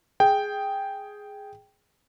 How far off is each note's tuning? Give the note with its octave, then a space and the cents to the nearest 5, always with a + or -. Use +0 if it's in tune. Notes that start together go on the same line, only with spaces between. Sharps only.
G#4 +0 G5 +0